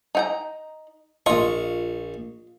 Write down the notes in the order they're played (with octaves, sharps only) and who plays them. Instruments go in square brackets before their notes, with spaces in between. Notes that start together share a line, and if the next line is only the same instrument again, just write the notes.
[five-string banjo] D#4 G5 A#5
[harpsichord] A#1 C#6 [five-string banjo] F4 D#5